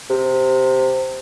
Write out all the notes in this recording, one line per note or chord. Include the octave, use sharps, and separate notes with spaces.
C3